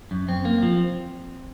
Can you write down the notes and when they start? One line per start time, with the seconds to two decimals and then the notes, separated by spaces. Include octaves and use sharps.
0.11 F#2
0.28 F#2 C4
0.45 A#3
0.62 F3